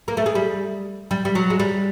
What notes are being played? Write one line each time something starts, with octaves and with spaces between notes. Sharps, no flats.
A#3
A3
G#3
G3
G3
G3
F#3
G#3
G3